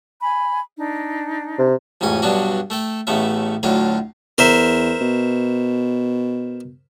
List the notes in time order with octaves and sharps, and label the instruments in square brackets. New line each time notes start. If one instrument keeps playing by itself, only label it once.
[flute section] G#5 B5
D4 D#4
[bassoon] C3
[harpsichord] A1 F2 G#2 C#4 G#5
G2 B2 F#3 B3 D4 F#4
A3 A4 G5
A1 C#3 A3 B3 E5
D2 A2 D3 F#3 F4 F5
[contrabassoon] E2 [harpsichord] A#4 C5 E5
[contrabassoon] B2